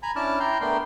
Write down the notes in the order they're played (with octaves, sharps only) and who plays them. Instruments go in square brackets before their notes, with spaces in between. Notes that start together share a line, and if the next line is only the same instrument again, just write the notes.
[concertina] G#5 A#5 B5
C#4 D4 E4 A5 D6 F6
E4 G5 A#5 C6
A3 B3 D4 A#4 G5 C6